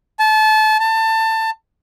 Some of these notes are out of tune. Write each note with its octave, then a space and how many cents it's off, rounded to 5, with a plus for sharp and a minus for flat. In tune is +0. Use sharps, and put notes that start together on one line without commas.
A5 -25
A5 +20